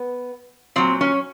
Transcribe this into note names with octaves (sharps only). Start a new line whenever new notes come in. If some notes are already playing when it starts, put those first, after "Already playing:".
Already playing: B3
A#2 F#3 C4
C#4